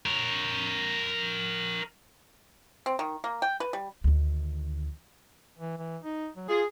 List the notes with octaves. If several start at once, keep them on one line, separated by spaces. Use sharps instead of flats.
A#4 C#5
C4
D#3
A#3
G5
B4
G3
D2 D#3
E3
E3
D#4
F#3
F4 G#4